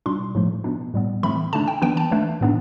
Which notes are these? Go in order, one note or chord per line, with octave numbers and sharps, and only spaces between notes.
B2 G3 D4 C6
A2 F3 A3
B2 B3 D4
A2 G3 B3
A2 E3 A3 C4 B5
D3 A3 D4 A5
G5
E3 B3 D4 G5
A5
E3 A3 D4
A2 E3 B3 D4